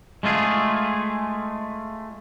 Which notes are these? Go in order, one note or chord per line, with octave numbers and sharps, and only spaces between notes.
G#3 A3 F4 G#4